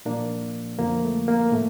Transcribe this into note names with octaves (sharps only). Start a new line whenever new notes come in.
A#2 F3 A#3 D4
F2 D3 F3 A#3
A3
A#3
A2 A3